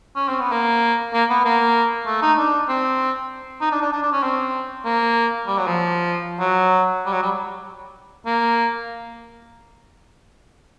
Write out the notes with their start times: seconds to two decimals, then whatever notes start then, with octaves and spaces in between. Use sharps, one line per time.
0.16 C#4
0.28 C4
0.40 B3
0.52 A#3
1.13 A#3
1.29 B3
1.45 A#3
2.06 A3
2.22 D#4
2.38 D4
2.68 C4
3.61 D#4
3.71 D4
3.82 D4
3.92 D4
4.03 D4
4.12 C#4
4.23 C4
4.85 A#3
5.47 G3
5.58 F#3
5.67 F3
6.39 F#3
7.06 G3
7.12 F#3
7.22 G3
8.26 A#3